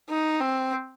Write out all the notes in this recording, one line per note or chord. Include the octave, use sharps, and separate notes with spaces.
D#4
C4